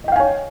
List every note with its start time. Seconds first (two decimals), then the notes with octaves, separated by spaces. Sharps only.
0.04 D#5
0.08 G5
0.12 F5
0.16 G#5
0.20 C#5